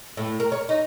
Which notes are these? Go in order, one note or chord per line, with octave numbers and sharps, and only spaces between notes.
A2
A#4
C#5
D#4